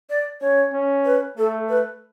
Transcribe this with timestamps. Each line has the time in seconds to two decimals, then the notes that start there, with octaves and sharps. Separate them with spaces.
0.10 D5
0.41 C#4 C#5
0.73 C#4
1.05 B4
1.37 A3 A4
1.69 B4